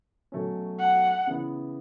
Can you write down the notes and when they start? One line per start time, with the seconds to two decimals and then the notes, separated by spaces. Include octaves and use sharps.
0.32 B2 F#3 A3 C#4
0.79 F#5
1.27 C#3 E3 B3 E4 B4